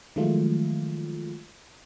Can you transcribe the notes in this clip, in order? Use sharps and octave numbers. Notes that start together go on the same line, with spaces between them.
D#3 F3 F#3 G#3 A3 F4